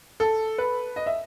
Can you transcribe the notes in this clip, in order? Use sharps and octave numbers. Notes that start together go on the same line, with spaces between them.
A4
B4
D#5
E5